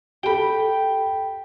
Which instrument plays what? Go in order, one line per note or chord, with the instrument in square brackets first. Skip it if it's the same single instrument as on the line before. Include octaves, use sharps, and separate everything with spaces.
[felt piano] G4 A4 [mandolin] G5 B5